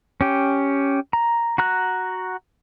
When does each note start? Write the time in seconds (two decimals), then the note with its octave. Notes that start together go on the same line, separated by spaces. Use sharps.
0.21 C#4 G4
1.13 A#5
1.58 F#4 A#5 F#6